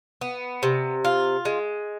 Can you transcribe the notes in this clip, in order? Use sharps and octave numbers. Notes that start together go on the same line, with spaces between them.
B3
C3
F4
G#3